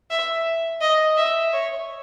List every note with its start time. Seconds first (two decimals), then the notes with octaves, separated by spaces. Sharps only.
0.10 E5
0.81 D#5
1.17 E5
1.53 C#5